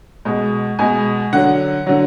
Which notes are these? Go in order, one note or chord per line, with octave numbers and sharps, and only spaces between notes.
B2 G#3
B2 G#3 G#5
D3 F#3 F#5
D3 F#3